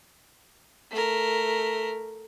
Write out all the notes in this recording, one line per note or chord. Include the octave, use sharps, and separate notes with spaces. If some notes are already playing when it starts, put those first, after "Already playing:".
A3 A#4